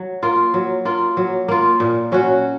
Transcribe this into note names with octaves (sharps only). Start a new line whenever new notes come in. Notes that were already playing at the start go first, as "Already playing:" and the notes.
Already playing: F#3
A#3 F4
F#3
A#3 F4
F#3
A#3 F4
A#2
F#3 C#4 F#4